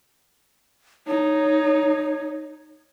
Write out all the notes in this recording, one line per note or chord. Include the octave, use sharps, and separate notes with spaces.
D#4 C#5